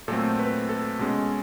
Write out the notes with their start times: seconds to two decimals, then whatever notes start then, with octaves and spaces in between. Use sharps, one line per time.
0.08 A#2 F#3 A3 C4 A4
0.39 B4
0.69 A4
0.99 B2 G#3 C#4